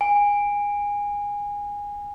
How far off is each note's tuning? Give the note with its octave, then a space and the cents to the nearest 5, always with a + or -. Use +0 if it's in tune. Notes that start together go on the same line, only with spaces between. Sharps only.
G#5 -20